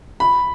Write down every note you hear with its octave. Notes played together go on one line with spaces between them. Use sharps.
B5